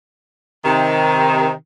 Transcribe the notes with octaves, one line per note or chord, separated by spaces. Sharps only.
C3 D#3